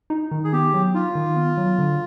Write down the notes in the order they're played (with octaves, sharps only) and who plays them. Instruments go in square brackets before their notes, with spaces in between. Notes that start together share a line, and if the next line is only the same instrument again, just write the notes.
[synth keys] D#4
D#3
[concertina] G#4
[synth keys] B3 [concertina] G4
[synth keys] F#3
[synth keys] D#4 [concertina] F4
[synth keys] D#3
B3
F#3
D3